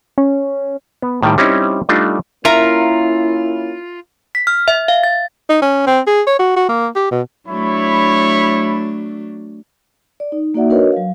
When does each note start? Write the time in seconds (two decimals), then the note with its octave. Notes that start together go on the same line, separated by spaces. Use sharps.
0.18 C#4
1.02 B3
1.22 A2 D#3 G3 G5
1.38 G3 C4 C#4 D#4 E4
1.89 G3 A3 D4 D#4 F4
2.45 A#3 C#4 E4 F4 A#4 E5 A#5
4.35 B6
4.47 F6
4.68 E5
4.88 F5
5.04 A6
5.49 D#4
5.62 C#4
5.87 C4
6.07 G#4
6.27 C#5
6.39 F#4
6.56 F#4
6.69 A#3
6.96 G4
7.11 B2
7.48 F#3 A3 D4 E4 C#5 B5
10.20 D5
10.32 D#4
10.54 A#3 D#4 F#4 D5 E5 F#5
10.70 D4 F#4 A#4 B4 C#5 D#5
10.92 F#3 F5